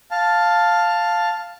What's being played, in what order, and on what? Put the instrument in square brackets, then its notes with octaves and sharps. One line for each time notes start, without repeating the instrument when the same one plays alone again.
[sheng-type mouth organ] F5 A5